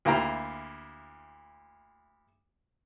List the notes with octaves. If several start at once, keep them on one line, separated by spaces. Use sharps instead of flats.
D2 A#3 E4 F4 G5 A#5